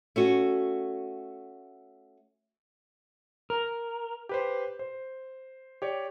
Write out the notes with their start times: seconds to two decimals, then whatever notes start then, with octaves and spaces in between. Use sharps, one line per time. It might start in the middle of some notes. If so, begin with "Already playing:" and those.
0.16 A3 C#4 F#4
3.50 A#4
4.29 G4 B4 C5
4.79 C5
5.82 G4 C#5 D5